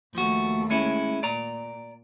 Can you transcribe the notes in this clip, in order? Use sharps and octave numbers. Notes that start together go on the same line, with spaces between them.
D#2 F3 A3 F#4
G#3 C#4 E4
A#2 D5 A#5